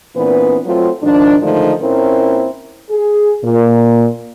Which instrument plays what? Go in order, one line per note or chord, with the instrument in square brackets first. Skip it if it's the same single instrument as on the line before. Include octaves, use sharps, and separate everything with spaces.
[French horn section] A#2 E3 B3 C4 D4 B4
F#3 A3 C4 F4
G#2 D#3 F3 D4
D3 D#3 F3 G#3 A3 D#4
A#2 A#3 C4 C#4 E4 A#4
G#4
A#2